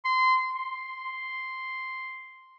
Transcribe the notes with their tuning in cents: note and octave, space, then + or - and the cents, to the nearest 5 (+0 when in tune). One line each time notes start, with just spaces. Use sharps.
C6 -20
C6 +0